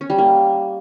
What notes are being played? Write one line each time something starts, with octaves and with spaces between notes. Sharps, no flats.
C#4
G3
A#3